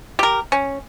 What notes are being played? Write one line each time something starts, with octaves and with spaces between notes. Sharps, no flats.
G4 A#4
C#4